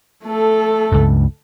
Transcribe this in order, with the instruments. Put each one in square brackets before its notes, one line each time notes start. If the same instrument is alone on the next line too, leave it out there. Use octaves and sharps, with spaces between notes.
[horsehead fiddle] A3 A4
[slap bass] C#2 G2